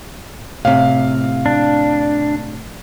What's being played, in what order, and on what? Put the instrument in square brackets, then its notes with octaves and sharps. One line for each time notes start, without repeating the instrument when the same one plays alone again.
[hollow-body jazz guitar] A2 C3 [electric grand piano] F5
[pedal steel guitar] D4